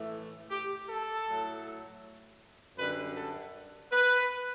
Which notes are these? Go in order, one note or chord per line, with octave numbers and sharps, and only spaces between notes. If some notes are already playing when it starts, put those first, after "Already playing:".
Already playing: A2 E3 A3
G4
A4
A2 F#3 A3
F#2 D3 G3 B4
A4
B4